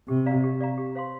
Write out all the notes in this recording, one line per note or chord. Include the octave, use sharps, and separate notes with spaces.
C3 G4
D5 F5 A#5
G4
D5 F5 A#5
G4
C5 F5 C6